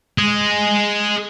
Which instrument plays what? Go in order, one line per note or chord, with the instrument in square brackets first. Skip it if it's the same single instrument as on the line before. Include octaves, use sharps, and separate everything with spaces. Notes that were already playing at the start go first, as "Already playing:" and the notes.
[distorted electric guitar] G#4 D#5